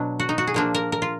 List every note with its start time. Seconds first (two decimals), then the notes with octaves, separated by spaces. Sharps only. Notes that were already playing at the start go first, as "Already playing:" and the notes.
Already playing: B2 F#3 D4
0.20 F#4
0.29 D#4
0.38 F#4
0.47 G#4
0.54 A#2 F3 A#3 D4
0.74 A#4
0.92 A#4
1.02 F4